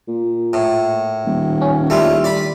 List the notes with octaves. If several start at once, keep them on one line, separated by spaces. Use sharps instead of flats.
A#2
A2
D#1
C#4
D#3 G3 A3 E4 F4
D5 B5